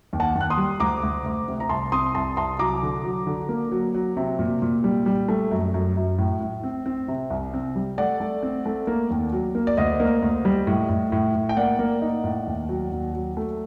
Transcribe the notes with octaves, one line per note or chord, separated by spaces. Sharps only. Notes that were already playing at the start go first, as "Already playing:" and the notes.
D#2
F#5 A5
D#2
F#6
C6 D#6
G3
D2 A#5 D6
D2
D2
C3
A#5
C2 A5 C6
C4 C6 D#6
C2 A5 C6
C2 A5 C6
F#3 A#5 D6
D3
F#3
D3
A#3
F#3
F#3
C3
A#2
A#2
G3
G3
A3
F#2
F#2
F#2
A2
A2
C4
C4
C3
C2
C4
G3
A3 D5 F#5
A3
C4
A3
A#3
D#2
F#3
A#3
D5
D2 D#5
A#3
D2
G3
A2
A2
A2
A2
G5
A#3 D5 F#5
A#3
D#4
A2
D#2
F#3
D#2
F#3
A3